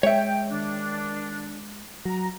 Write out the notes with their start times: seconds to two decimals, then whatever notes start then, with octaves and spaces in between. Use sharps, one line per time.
0.03 G#3 C#5 E5 G5
0.50 D#3 D4
2.05 F#3 A#5